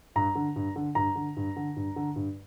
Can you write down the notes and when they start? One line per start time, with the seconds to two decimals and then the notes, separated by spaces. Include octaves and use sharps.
0.16 G2 A#5
0.35 D3
0.56 G2
0.76 D3
0.95 G2 A#5
1.16 D3
1.37 G2
1.56 D3
1.76 G2
1.96 D3
2.16 G2